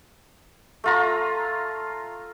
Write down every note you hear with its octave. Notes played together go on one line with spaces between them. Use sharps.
A3 F4 A#5